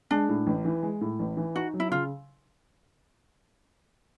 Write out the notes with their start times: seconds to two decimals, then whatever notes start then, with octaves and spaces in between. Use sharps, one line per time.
0.11 G#3 D4
0.29 A2
0.47 A1
0.65 E3
0.83 G#3
1.01 A2
1.19 A1
1.37 E3
1.55 D#4 F#4
1.74 F#3
1.80 E4
1.91 C#3 F4